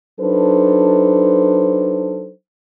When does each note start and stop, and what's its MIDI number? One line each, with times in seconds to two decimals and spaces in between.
0.20 2.30 54
0.20 2.30 62
0.20 2.30 63
0.20 2.30 69
0.20 2.30 71
0.20 2.30 72